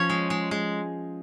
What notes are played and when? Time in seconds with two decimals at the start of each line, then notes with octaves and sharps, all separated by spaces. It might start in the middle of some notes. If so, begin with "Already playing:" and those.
Already playing: F3 C#4 C#5
0.10 G#3
0.30 G#3
0.51 G#3